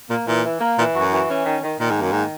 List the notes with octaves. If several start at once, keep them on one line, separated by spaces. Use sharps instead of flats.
A#2 A#3
A#2 E3
E3
A#3
A#2 E3
F#2 F#4
E3
C#4
D#3
D#3
A#2 D#3
G#2
F#2 A#3
G#2 D#3